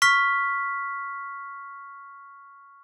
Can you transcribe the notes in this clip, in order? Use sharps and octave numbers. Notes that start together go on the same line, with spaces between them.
C#6 F6 B6